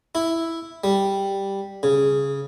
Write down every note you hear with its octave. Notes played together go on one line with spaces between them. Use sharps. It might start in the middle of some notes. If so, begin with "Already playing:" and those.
E4
G3
C#3